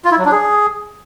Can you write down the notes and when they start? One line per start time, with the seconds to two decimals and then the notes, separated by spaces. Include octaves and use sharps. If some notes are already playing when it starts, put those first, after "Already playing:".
0.05 F4
0.11 E4
0.18 F#3
0.25 D4
0.32 G#4